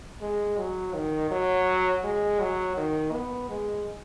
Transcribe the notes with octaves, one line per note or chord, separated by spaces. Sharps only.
G#3
F#3
D#3
F#3
G#3
F#3
D#3
B3
G#3